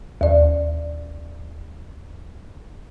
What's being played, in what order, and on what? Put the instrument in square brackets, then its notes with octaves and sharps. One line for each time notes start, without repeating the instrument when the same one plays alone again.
[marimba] D#2 D5